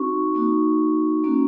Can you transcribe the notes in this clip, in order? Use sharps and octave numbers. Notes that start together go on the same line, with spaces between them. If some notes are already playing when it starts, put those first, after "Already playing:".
Already playing: C4 D#4 F#4 C#6
A#3 D#4 F#4
A#3 C#4 F#4